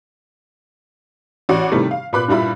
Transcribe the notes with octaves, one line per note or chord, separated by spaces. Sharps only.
A1 F#4 D5
C3 D#3 E3 G3 A3
F5
A#2 B3 B5 D6 F#6
G2 A#2 G3 E4 B5